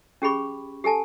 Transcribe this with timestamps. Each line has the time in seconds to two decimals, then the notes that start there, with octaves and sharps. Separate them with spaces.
0.22 C#4 G4 G#4 B5 C#6
0.84 G4 A4 G#5 A5